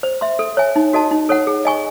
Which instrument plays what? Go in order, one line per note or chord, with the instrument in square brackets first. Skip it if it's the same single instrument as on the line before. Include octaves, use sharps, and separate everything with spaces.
[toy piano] C5
E5 C6
A4
C#5 E5 G#5
D#4
F#4 A4 D#5 A5
D#4
A4 C#5 F#5
G#4
D#5 G#5 C#6